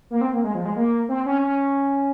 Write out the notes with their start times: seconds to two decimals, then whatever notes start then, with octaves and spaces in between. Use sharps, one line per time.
0.10 A#3
0.21 C4
0.33 A#3
0.44 G#3
0.55 F3
0.65 G#3
0.76 A#3
1.09 C4
1.26 C#4
1.42 C#4